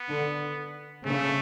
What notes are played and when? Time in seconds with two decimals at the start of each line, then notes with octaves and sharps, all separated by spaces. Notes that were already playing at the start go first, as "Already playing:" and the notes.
Already playing: B3
0.09 D3
1.06 C#3 A3